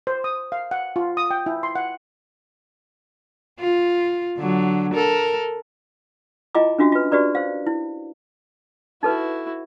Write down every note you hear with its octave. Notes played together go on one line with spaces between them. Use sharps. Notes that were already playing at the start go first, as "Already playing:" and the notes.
C5
D#6
F5
F#5
F4
D#6
G5
E4
C6
F#5
F4
D3 F#3
A4 A#4
E4 F4 D#5 G5 A#5 D6
C#4 D4 F4 F#4 E5
F4 B4
F#4 G4 B4 D5 A#5
C5 F5
E4
D#4 E4 F#4 A4 B4